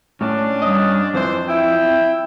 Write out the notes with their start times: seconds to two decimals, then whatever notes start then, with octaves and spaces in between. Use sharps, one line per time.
0.21 A2 C#4 D4
0.62 G2 D#5
1.14 F2 E3 C5
1.49 E4 G5